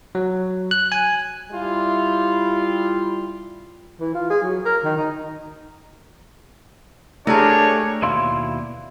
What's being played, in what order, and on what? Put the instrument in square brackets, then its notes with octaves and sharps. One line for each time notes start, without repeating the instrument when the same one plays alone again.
[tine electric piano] F#3
F#6
G#5
[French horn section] G3 E4 F4
[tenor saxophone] E3
F4
G#4
F#3
A#4
D#3
D#4
[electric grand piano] A3 G4 [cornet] D4 [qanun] G#4 A#4 [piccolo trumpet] C#5
[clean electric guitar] D#2 B2 E4 D5 F5 C6